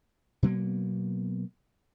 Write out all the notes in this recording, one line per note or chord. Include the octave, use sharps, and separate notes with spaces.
B2 F#3 A#3 B3